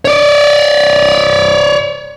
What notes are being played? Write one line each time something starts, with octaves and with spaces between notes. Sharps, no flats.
C#5 D5